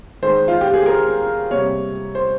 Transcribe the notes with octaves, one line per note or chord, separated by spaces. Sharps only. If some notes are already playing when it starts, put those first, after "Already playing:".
D#3 G#3 C5
F4
G4
G#4
A#4
C3 G3 A#3 C#5
C5